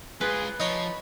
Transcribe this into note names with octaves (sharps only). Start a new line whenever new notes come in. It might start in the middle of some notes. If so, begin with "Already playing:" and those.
G#3 F4 G#4 B4
F3 D#4 C#5 B5